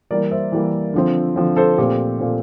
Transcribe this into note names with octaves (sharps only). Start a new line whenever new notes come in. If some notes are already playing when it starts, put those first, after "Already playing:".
E3 G3 A#3 A#4 D5
C5 E5
E3 G3 A#3
D3 F3 C4
D3 F3 C4
A4 C5
A#2 A3 C4 G4
A#2 A3 C4